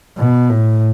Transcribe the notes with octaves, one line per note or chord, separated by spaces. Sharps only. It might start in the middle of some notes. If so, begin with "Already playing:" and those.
B2
A2